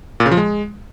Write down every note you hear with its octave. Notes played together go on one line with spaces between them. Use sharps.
A#2
C#3
F3
G#3